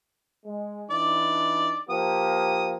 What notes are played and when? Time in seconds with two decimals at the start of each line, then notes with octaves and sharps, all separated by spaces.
0.46 G#3
0.91 E3 D4 D#4 D5
1.90 F3 A#3 G4 D#6